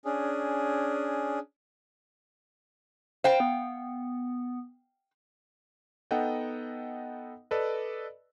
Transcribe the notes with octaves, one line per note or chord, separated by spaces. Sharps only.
C#4 D4 G#4
C5 F5 G5
B3
B3 D#4 A4 D#5 F#5 G5
A4 B4 D5 D#5